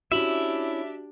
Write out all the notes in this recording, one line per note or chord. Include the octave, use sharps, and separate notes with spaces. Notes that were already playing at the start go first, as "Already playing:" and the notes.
C#4 D4 E4 F#4 G4 E5 F#7